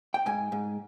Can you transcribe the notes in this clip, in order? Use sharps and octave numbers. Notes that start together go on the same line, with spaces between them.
G5
G#2 G#5
G#2